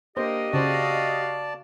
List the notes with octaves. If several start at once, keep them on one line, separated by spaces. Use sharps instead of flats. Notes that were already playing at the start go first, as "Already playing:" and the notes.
A#3 D4 G4 C5 D#5
C#3 F#4 C5 D5 F5 A5